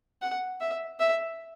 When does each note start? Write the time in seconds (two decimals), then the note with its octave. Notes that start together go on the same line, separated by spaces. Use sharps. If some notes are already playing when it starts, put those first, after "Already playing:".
0.22 F#5
0.61 E5
1.00 E5